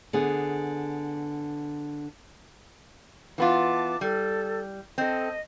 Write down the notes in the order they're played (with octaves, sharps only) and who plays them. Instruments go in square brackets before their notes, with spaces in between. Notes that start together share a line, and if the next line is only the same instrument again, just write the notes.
[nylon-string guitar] D3 B3 G#4
[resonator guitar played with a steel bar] E3 B3 F4 [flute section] A5 D6
[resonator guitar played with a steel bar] G3 [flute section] A4
[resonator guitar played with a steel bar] C4 A4 [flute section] D#5